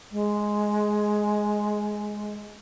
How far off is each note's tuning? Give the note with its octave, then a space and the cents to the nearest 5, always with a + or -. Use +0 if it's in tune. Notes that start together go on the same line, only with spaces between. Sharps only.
G#3 +5